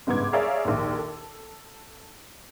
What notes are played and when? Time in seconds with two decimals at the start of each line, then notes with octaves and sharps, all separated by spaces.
0.07 G1 C#2 G#2 B3 D6 G#6
0.33 G#4 C#5 D5 E5 F5 A#5
0.65 A#1 D#2
0.99 A4